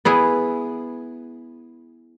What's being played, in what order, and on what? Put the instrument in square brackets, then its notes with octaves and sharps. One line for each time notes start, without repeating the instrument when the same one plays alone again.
[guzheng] B3 E4 G#4